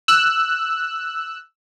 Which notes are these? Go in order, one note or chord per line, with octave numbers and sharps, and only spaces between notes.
E6 F#6